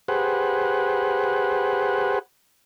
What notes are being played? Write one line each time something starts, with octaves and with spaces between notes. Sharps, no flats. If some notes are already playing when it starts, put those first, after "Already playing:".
G4 G#4 B4 C5 F#5